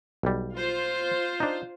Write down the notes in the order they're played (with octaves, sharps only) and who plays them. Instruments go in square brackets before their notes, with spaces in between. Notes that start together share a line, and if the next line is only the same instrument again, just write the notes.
[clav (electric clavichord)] B1 G3
[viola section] F4 C5
[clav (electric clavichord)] D4 D#4